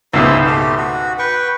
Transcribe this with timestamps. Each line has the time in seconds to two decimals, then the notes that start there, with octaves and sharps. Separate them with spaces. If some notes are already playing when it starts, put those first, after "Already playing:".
0.13 C#2 G#2 B2 E4 C5 E6
0.46 A3 G4
0.77 F#4
1.19 B4 G5 C#6